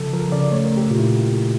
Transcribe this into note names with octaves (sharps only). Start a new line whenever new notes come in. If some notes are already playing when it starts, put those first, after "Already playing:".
Already playing: C#3 F3 A4
F3 A#4
C#3 D5
A3 C#5
A#4
A3
G4
A#2 F4
E4